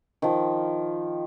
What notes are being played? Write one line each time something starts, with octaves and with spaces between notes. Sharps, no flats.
D#3 F3